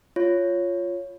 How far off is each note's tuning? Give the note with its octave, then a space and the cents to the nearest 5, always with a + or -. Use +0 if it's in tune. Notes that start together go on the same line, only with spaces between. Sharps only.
F4 +0 C#5 +0